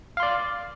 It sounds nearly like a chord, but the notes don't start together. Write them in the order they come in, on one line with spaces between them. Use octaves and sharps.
F5 C6 D5